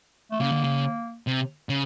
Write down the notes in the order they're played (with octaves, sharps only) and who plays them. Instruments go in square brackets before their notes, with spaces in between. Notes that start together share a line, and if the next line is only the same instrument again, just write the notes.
[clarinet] A3
[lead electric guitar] C#3 [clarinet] A#3
[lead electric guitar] D3
C#3
C3
C#3